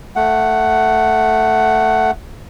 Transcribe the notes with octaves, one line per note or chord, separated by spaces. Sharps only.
A3 F#5